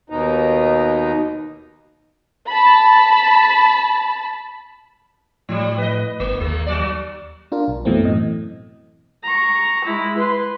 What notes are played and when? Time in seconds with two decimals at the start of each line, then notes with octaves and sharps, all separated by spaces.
0.10 D#2 B2 D#4
2.47 A5 B5
5.49 A2 F3 G3
5.78 B4 D#5
6.20 G1 A#3
6.40 D#2 G#3 A#3
6.67 F#3 D5
7.52 D4 F4 A#4
7.68 B1
7.85 F#2 B2 E3 A3 C4
8.05 A2 D#5
9.23 A#5 C#6
9.85 G#3 E4
10.17 B4 C6